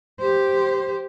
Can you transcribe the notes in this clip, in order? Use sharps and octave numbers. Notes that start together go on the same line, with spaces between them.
G4 C5